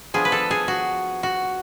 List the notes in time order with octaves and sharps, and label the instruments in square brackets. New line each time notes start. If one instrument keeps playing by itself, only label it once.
[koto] F3 B3 D4 G#4
B4
A4
G#4
F#4
F#4